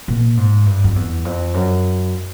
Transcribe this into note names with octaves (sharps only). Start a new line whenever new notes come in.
A#2
G#2
G2
F2
E2
F2
F#2